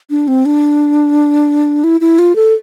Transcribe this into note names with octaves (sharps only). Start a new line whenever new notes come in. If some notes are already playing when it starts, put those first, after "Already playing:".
D4
C4
D4
E4
E4
F4
A4